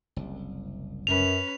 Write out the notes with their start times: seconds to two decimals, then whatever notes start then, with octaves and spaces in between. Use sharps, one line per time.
0.16 F#1 C2
1.07 F#2 C#4 B4 F7